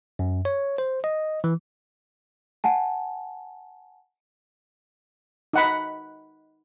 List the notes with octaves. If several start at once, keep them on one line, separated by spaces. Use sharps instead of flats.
F#2
C#5
C5
D#5
E3
F#5 G#5 A5
D#4 F#5 B5